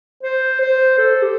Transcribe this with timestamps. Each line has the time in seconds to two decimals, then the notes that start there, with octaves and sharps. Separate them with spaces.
0.23 C5
0.61 C5
0.98 A4
1.22 G4